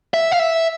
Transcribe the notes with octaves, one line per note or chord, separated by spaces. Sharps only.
E5
F5
E5